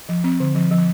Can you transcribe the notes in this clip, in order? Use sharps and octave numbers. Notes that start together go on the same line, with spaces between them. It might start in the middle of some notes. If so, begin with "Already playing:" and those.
F3
C4
D3
F3
F3